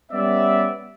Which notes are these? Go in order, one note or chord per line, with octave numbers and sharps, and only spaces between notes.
G3 B3 C#4 G4 D5 E5